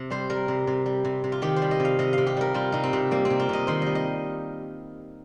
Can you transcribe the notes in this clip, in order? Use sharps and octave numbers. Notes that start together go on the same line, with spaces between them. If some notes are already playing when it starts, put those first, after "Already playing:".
Already playing: C3
G3 C5
G3 A#4
C3
C3
G3
C3
C3
F4
D#3 G4
C5
G3
D#5
C3 F5
C3 D#5
C3 F5
G4
G3 A#4
G3 F4
C3 D#4
C4
C3
G3 A#3
C4
C3
F4
C3 D#5
D#3 C5
G3 D#5
D#5